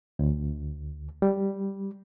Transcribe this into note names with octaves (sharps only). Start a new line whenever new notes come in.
D2
G3